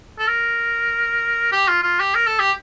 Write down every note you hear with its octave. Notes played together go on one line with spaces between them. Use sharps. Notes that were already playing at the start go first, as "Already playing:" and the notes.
A4
A#4
G4
F4
F4
G4
A#4
A4
G4